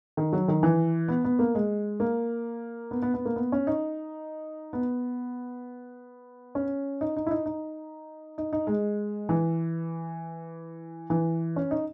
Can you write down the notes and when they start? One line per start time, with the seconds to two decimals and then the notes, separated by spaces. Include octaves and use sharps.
0.17 D#3
0.33 F#3
0.48 D#3
0.63 E3
1.08 B3
1.25 B3
1.39 A#3
1.55 G#3
2.00 A#3
2.91 B3
3.02 B3
3.14 B3
3.25 A#3
3.36 B3
3.52 C#4
3.67 D#4
4.73 B3
6.55 C#4
7.01 D#4
7.17 D#4
7.27 E4
7.31 D#4
7.46 D#4
8.38 D#4
8.53 D#4
8.67 G#3
9.29 E3
11.10 E3
11.56 C#4
11.71 D#4